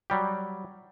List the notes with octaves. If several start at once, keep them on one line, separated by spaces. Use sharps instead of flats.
F#3 G3 G4